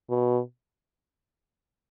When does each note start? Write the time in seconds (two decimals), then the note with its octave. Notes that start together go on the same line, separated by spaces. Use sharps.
0.10 B2